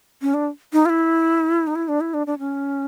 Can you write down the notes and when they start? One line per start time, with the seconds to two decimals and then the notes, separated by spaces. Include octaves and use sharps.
0.22 C#4
0.34 D4
0.73 D#4
0.86 F4
0.90 E4
1.67 D#4
1.76 E4
1.88 D4
2.01 E4
2.14 D4
2.27 D4
2.39 C#4